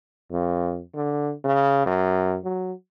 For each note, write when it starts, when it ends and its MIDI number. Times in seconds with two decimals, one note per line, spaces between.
0.32 0.81 41
0.95 1.32 50
1.44 1.86 49
1.86 2.37 42
2.44 2.73 54